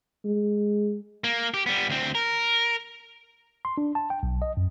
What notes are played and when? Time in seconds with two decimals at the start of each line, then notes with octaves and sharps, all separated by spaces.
0.25 G#3
1.24 A#3
1.54 G4
1.66 G3 B3
1.89 D2 C4
2.15 A#4
3.65 C6
3.78 D4
3.95 A5
4.10 G5
4.23 B1
4.42 D#5
4.57 F#2